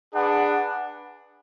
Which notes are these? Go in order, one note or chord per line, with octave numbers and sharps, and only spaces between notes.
D4 G#4 B4 F#5